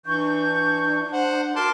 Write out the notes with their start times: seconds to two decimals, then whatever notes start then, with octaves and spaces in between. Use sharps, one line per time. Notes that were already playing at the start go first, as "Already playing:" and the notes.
0.06 E3 D4 C#6 G6
1.13 C5 F#5
1.56 F#4 A#4 A5 C6 D6 F6